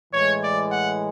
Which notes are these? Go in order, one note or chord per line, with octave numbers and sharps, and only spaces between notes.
A2 E3 G#3 C#5
D5
F#5